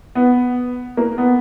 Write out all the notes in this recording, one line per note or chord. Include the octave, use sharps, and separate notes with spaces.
B3
A#3
B3